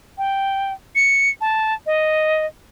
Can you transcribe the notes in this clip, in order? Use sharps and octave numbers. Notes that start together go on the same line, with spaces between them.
G5
C#7
A5
D#5